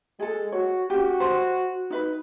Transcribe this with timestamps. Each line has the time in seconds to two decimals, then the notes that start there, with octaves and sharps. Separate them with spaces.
0.20 G#3 G#4 A4
0.52 F#4 C#5
0.90 C#4 F#4 G4
1.20 C5
1.90 D#4 B4